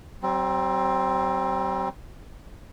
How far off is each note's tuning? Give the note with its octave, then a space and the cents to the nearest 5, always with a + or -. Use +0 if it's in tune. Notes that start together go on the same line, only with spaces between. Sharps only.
G3 -45 C4 +10